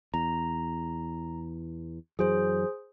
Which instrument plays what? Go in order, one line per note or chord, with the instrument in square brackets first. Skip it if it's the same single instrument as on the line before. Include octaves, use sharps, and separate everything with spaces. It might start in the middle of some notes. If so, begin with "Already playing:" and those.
[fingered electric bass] E2 [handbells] A#5
[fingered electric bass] F#2 E3 F#3 [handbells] G#4 C5